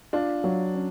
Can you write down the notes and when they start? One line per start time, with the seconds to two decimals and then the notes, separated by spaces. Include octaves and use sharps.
0.13 D4 F4
0.44 F#3
0.75 C#4